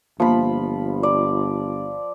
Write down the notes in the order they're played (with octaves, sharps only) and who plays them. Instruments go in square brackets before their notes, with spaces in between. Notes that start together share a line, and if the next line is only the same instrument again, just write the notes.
[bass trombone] G1 [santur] F3 B5 [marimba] A#3
[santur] D5